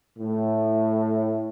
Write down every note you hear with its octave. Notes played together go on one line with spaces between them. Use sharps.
A2